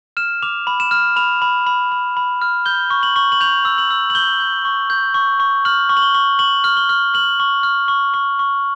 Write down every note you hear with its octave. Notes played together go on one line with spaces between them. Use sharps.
F6 E7
D6 F7
B5
E7
F6
B5 F7
B5
B5
B5
B5
F6
G6 G7
C#6
F#7
C#6
F#7
G6 F7
E6
F#7
E6
F#7
G6 G7
G6
C#6
G6
C#6
C#6
F6 F#7
C#6
F#7
G7
C#6
C#6 F#7
F6
G7
F6
F6 F#7
C#6
F6
C#6
C#6
C#6